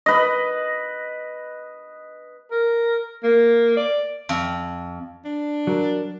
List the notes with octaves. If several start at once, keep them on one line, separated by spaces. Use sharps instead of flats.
B4 D#5
A#4
A#3
D5
F2
D4
F#3 A#4